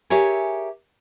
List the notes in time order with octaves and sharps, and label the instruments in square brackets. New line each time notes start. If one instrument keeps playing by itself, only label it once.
[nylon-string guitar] G4 G#4 A#4 C#5 E5 G#5